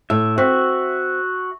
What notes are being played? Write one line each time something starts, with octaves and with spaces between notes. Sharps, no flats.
A2 E5
C4 F#4 E5